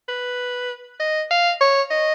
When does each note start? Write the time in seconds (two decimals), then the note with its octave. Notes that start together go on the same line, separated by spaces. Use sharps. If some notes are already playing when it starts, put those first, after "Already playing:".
0.08 B4
1.00 D#5
1.31 F5
1.61 C#5
1.91 D#5